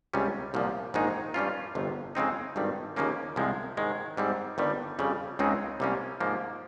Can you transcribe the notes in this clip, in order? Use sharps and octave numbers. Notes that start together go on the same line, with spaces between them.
C#2 C3 G3 C#4
C2 A#2 F3
A#1 G#2 D#3 G#3 D#4
G2 G3 C#4 F4
G1 F2 C3
F2 C#3 G#3 C4 D#4
G#1 G2 D#3 G3
D#2 C#3 F3 A#3 C#4
C2 C3 F3 G#3
G#2 D#3 G#3
G#2 G3 C4
G1 G2 D#3 G3
F2 C#3 G3
C#2 C#3 G#3 C4 D#4
C2 C3 G3 A#3 C#4
G#2 F3 A#3